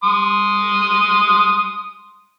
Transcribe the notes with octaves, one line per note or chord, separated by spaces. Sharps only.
C6 D#6